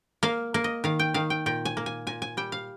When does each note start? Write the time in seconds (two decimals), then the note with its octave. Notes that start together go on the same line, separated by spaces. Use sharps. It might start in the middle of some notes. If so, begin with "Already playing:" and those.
0.23 A#3 F5
0.54 A#3
0.64 D#5
0.84 D#3 F5
0.99 G5
1.14 D#3 F5
1.30 G5
1.46 A#2 G5
1.65 G#5
1.77 A#3
1.86 G#5
2.07 A#2 G#5
2.22 G#5
2.37 G3 G5
2.52 F5